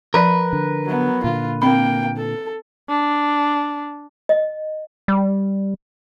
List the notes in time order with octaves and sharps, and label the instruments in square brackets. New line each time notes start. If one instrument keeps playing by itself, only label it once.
[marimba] F3 D5 [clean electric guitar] A#4 B4
[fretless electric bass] D3
[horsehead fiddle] F#3 B3
[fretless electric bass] A#2 D3 [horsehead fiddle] F4
[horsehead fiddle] A#3 G5 [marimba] C4 B5
[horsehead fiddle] A4
[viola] D4
[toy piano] D#5
[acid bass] G3